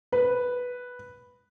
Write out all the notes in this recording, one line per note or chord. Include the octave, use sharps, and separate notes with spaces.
B4